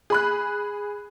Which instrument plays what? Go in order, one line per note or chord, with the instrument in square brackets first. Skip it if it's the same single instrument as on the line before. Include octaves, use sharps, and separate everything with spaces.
[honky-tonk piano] G#4 B5 F#6